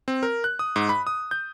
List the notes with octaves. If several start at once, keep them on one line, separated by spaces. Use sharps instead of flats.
C4
A#4
F#6
D#6
G#2
B5
D#6
G6